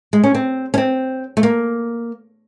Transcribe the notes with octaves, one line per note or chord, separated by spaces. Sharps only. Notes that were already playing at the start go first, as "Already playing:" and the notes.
G#3
C#4
C4
C#4
C4
A3
A#3